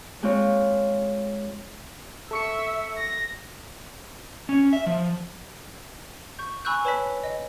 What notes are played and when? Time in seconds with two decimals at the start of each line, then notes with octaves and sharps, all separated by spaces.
0.23 G#3 C4 F4 C#5
2.31 A4 E5 C#6 C#7
2.97 A#6
4.49 C#4
4.73 E5
4.87 F3
6.39 C#6 G6
6.65 G#5 B5 C#6 E6 F#6 G6
6.85 B4 C#5 A5 B5 B6
7.24 D#5